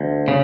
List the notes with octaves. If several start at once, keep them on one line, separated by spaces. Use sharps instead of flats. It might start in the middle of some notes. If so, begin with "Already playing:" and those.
Already playing: D2
C#3